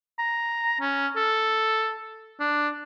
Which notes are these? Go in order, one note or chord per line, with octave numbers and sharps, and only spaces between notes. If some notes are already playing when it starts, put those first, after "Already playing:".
A#5
C#4
A4
D4